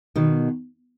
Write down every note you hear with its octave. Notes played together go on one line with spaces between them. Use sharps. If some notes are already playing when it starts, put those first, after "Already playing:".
B2 D#3